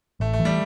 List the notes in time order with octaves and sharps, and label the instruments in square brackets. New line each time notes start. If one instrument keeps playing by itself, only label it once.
[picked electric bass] A1 [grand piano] A3
[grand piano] A3
[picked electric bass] E3
[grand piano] G3